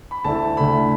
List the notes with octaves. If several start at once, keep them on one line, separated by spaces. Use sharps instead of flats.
B5
D2 D3 A3 E4 A5
D2 D3 A3 E4 B5